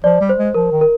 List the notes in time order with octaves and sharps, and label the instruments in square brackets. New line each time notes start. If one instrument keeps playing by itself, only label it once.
[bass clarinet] F3 [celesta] D5
[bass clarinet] G3
[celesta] C5
[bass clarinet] G#3
[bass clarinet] F3 [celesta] A#4
[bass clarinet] D#3
[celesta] A#4